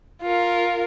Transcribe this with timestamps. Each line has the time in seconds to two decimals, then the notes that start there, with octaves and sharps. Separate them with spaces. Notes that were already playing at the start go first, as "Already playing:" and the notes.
0.22 F4 A#4